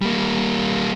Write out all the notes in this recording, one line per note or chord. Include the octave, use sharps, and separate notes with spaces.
G3 A#3